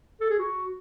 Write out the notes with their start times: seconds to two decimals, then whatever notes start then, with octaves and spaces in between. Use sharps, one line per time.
0.21 A4
0.30 G#4
0.39 F#4